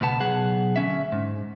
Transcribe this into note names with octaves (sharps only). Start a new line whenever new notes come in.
C#2 B2 B3 A5
B1 G#4 F#5
D2 C#4 E5
G#2